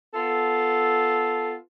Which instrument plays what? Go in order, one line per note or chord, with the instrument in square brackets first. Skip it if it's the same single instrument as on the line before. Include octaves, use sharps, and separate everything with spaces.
[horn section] B3 F4 A4